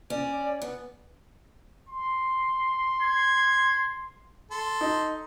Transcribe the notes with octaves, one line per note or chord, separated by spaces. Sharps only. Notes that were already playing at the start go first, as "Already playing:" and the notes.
C#4 D5
B3
C6
G#6
A4 C6
D#4